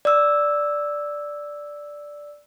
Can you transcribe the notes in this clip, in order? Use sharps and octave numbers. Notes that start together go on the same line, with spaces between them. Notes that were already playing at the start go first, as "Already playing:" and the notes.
D5 E6